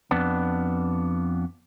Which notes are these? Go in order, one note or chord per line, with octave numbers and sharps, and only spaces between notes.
F2 B3 D4